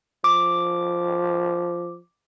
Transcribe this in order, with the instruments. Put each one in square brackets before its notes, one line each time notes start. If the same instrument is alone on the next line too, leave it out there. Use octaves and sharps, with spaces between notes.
[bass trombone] F3 [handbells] D6